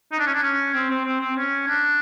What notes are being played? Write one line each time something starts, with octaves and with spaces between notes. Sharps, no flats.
D#4
D4
C#4
D4
C#4
C4
C4
C4
C4
C#4
D4